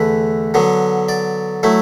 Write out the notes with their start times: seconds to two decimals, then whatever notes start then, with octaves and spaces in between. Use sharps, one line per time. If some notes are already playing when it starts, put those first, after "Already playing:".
Already playing: E2 D3 A3 B4
0.54 D3 F#3 B3
1.09 D5
1.63 F#3 A3 E4